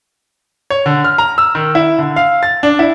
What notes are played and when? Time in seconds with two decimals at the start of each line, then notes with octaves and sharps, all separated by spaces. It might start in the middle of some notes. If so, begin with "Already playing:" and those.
0.70 C#5
0.86 D3
1.04 F6
1.18 A#5
1.38 E6
1.55 D#3
1.75 E4
1.98 D3
2.16 F5
2.43 A6
2.63 D4
2.79 E4